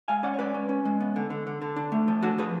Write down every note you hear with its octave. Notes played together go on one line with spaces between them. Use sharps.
G#3 F5 G#5
C#4 D5 F#5
C#5
G#3 B4 D5
C#4
C#4
G#3
B3
D3
D3
D3
D3
D4
A3
F3
D4 F#4 A4
F3 G#4 B4